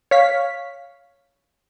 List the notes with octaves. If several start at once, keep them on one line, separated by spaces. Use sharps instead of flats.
C#5 F5 B6